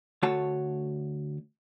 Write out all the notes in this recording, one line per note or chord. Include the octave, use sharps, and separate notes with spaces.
D2 A3 F#4 C#5 A5